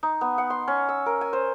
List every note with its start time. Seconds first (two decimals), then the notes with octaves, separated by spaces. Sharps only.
0.03 D#4
0.21 B3
0.38 F#5
0.50 C6
0.68 C#4
0.89 E6
1.06 A#4
1.21 G#5
1.33 C5